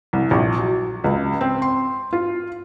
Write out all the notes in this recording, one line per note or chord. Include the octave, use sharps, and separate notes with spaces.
C2
A#1
F#3
C#2
C4
C6
F4